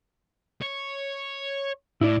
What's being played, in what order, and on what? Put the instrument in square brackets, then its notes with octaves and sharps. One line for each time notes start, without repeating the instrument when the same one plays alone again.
[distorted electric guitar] C#5
[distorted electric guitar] A2 [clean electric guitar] E4 D5